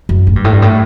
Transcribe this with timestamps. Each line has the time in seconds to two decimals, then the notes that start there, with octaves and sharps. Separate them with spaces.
0.09 F#2
0.27 A2
0.36 G2
0.44 A2
0.52 G2
0.62 A2